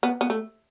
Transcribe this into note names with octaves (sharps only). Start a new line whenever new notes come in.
B3
B3
A3